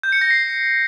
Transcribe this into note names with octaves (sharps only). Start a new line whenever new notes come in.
G6
C#7
A#6
C7